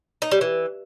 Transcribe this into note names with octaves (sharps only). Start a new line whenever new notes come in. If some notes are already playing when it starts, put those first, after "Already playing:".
D#4
G3
E3